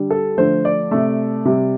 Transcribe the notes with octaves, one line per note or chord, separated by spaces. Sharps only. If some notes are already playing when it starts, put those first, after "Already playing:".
Already playing: D3 G3
A4
D3 F3 A3 C5
D5
C3 A3
C3 G3